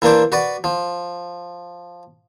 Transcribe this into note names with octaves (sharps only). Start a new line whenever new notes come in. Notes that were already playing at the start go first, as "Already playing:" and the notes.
E3 A#3 D4 C5 D6
F#4 B4 D5
F3